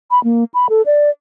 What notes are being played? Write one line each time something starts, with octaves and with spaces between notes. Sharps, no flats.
B5
A#3
B5
A4
D5